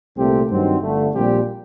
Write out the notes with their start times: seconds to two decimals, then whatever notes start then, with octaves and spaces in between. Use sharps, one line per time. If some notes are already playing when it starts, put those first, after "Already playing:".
0.16 C2 A#2 A3 C4 G4
0.50 G2 D#3 F#3 C4
0.82 G1 G2 D3 A3
1.14 A#1 A#2 G3 C4 G4